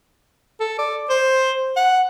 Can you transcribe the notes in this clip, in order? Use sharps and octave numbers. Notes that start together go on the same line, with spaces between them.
A4
D5
C5
F#5